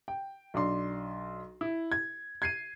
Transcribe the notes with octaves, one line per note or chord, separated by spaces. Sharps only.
G5
B1 D4 C6
E4
G#6
G#6 C7 D#7